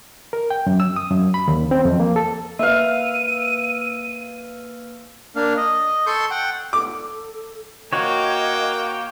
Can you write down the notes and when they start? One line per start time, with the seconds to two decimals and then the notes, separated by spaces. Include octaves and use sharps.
0.33 A#4
0.50 G5
0.67 F#2
0.80 E6
0.96 D#6
1.11 F#2
1.34 B5
1.48 D#2
1.71 C4
1.85 F2
2.00 A#3
2.16 A4
2.59 A#3 B4 E5 F5 D#7
5.36 A#3 D4 F5
5.57 D#5
6.07 A4 C6 C#6 G6
6.31 F#5 G5
6.73 A4 D6
7.93 A#3 F#4 C#5 D#5 G5